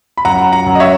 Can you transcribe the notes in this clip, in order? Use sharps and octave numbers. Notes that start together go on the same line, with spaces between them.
B5
F#2 F#5 A#5
F#5 A#5
F#2
D#5
C#5 E5